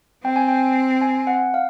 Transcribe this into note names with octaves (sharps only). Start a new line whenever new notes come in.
C4 G5
G#5
G5
G#5
F#5
F5